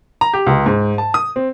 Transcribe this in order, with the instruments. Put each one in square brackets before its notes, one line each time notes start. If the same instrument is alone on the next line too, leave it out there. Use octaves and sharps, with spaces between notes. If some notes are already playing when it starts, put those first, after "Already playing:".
[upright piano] A#5
G4
C#2
G#2
A5
D#6
C4